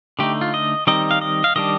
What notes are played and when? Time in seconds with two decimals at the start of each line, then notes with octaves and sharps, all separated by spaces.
0.19 D3 A3 D#4 G4
0.41 F4
0.54 D#5
0.87 D#3 G3 C4 D#4 D#5
1.11 F5
1.21 D#5
1.44 F5
1.56 D#3 G3 D4 D#5